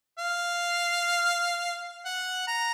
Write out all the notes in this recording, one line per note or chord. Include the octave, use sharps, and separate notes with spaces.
F5
F#5
A#5